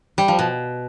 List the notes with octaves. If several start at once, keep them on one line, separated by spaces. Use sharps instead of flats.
G3
F3
B2